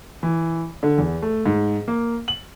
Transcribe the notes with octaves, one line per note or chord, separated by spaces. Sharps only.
E3
D3
E2
A3
G#2
A#3
F#7